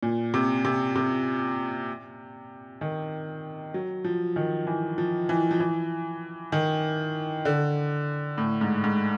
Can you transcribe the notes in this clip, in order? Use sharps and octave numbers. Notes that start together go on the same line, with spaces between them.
A#2
C3
C3
C3
D#3
F#3
F3
D#3
E3
F3
E3
F3
E3
D#3
D3
A2
G#2
G#2